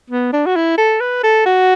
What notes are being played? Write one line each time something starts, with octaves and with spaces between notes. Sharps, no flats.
B3
D4
F#4
E4
A4
B4
A4
F#4